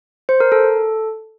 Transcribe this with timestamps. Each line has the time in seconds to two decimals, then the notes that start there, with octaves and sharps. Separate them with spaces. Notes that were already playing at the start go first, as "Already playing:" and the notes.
0.29 C5
0.40 A#4
0.52 A4